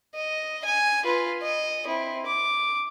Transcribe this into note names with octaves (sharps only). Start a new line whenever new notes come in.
D#5
G#5
F4 B4
D#5
C4 E4
D6